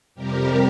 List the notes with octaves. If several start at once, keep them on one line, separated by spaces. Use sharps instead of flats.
F2 C3 G3 G4 A#4